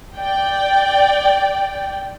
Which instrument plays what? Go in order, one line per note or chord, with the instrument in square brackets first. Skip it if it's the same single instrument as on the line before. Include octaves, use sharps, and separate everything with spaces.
[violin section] D5 G5